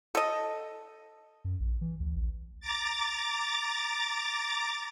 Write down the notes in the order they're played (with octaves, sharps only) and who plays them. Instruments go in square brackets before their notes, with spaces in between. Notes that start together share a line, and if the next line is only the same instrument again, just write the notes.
[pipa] A4 D#5
[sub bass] F#2
A#1
E3
D2
A#1
[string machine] A#5 D6 A6